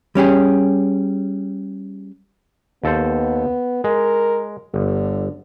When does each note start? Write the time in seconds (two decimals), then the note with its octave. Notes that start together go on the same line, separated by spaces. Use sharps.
0.15 G3 C#4 G4 G#4
2.84 D#2 B3 A4 C5
3.84 G#3 A#4
4.74 G1 D3